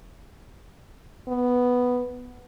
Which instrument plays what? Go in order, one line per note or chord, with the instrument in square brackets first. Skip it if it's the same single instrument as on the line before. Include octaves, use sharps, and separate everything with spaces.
[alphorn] B3